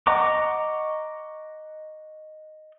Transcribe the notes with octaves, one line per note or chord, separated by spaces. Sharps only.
D#5 F#5 A#5 C#6 D6